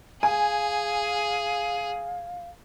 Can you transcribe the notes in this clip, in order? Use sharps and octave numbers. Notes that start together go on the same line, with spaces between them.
G#4 F5 G#5